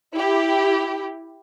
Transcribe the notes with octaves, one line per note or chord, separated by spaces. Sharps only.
E4 G4